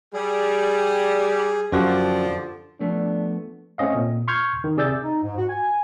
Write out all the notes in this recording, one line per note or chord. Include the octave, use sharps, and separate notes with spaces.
G3 G#4
F#2 D3 F3 F#4 G4 D5
F3 A3 B3 D4
A3 C4 C#4 D#5 F5
A#2
C6 C#6 F6 G6 G#6
D#3
C3 G#4 D5 E6 G6 A6
D#4
G#2
F#4
G#5